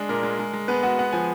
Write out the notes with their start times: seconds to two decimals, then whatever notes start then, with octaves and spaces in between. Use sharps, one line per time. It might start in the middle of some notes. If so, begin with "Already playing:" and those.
Already playing: G#3 D4
0.09 A#2 A#4
0.23 G#3
0.39 G#3
0.53 G#3
0.68 G#3 B3 B4
0.83 G#3 F#4 F#5
0.99 B3 F#5
1.12 F3 G#5